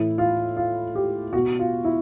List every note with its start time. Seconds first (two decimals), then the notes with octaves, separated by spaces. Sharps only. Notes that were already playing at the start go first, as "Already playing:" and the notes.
Already playing: A2 E3 E4
0.18 F4
0.57 F4
0.95 G4
1.33 B2 F#4
1.59 F4
1.85 E4